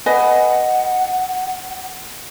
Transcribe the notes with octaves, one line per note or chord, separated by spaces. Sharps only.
B4 D#5 F#5 G#5